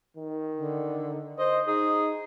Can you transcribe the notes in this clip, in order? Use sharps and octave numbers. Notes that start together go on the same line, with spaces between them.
D#3
D3
C5 D#5
D#4 G#4